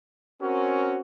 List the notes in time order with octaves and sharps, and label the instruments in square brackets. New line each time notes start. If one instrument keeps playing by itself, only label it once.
[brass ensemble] C4 C#4 A#4 [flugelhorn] F#4